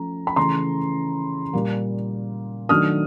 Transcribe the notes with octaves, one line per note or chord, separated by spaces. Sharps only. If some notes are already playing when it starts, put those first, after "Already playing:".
Already playing: F3 A3 C#4 A#5
B5
C#3 E3 A3 A#5 C6
A#2 G3 A#3
D#3 F#3 A3 D4 D#6 F6